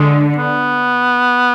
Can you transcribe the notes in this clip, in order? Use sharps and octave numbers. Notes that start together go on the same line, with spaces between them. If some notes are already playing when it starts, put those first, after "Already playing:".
Already playing: D3 G#3
B3